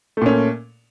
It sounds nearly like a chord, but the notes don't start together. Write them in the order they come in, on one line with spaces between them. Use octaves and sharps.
A3 A#2 C#4